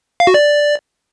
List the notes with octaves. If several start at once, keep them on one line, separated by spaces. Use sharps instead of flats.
F5
F#4
D5